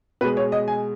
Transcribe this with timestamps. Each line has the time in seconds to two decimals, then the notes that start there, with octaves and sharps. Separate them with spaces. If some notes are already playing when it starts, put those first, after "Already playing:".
0.21 B2 B4
0.25 G#3
0.37 C#5
0.52 D#5
0.68 G#5